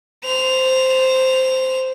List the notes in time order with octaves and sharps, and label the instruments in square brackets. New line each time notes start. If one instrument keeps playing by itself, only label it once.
[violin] C5 F7